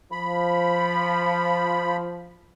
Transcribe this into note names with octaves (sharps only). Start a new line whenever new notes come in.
F3 B5